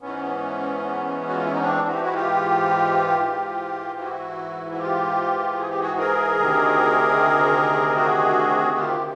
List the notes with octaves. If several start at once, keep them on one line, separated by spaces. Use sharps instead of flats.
G#2 E3 B3 C#4
F#4
F4
E4
D#4
C4 D4
F#4
G4
E4 F#4
F4 G4
G#2 E3
E4 F#4
F#4
F4 G4
G#4
G4
F#4 G#4
G#4 A#4
D2 C3 D#3
F#4 G#4
F4 G4
F4